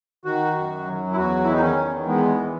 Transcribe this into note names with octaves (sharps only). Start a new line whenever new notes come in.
D#3 F#4
F#2
F#3
E4
E2 F#4
D#3 E4
D#4
C#4
E2
G#3 B3
E3